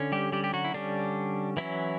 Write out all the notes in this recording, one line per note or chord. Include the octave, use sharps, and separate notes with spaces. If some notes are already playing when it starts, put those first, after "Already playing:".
Already playing: D3 C#4
G3 G4
G3 G4
G4
F#3 F#4
E4
D3 G3 C#4 D4
E3 F#3 C#4 E4